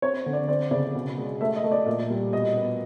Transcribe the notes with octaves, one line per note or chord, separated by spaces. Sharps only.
C4 C#5
D3
D5
C4 D5
C#3 D5
B2
G#3
A3 E5
D#5
A3
D5
A#2
G3
B2 D#5
B3